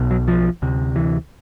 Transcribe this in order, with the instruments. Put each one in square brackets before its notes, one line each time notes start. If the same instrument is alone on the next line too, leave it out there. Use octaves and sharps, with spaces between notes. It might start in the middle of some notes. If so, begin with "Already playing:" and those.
Already playing: [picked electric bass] B1 B2
F#3
F3
D2 C3
E3